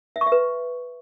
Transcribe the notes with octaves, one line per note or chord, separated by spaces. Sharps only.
E5
C#6
E5
B4